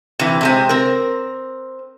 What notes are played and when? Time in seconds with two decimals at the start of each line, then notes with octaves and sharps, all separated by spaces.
0.19 C3 E3
0.41 C3 G#3 C4
0.69 C4 A#4